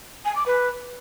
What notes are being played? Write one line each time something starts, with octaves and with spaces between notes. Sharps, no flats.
G#5
D6
B4